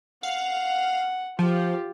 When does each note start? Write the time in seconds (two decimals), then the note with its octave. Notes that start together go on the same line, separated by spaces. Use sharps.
0.23 F5 F#5
1.39 F3 F4 G4